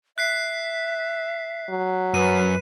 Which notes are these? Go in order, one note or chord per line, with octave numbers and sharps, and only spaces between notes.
E5 F#6 B6 C7
F#3
F#2 B4 D#7